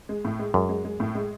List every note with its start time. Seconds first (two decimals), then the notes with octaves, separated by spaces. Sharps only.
0.09 G#3
0.25 A2
0.39 G#3
0.54 F#2 G#3
0.69 G#3
0.85 G#3
1.00 A2
1.15 G#3